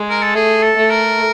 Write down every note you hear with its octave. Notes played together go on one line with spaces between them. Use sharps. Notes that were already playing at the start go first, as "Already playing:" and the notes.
Already playing: G#3
A#4
A4
A3 G#4
A4
A3
A#4